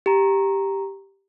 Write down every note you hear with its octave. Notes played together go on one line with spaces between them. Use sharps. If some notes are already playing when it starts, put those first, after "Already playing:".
G4 A#5